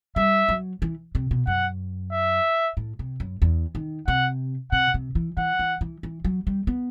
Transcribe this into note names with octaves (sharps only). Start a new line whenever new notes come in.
G3 E5
F#3
E3
C3
B2
F#2 F#5
E5
A2
C3
F#2
E2
D#3
C3 F#5
C3 F#5
C3
E3
E3 F#5
E3
E3
E3
F#3
G3
B3